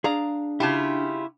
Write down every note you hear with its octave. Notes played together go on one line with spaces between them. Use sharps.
D4 G#4 D5 F5 A#5
C#3 E4 F4 G4 A5